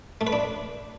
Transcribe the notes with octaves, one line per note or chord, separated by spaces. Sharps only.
A3
B4
D4